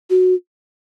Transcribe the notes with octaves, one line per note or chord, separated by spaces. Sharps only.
F#4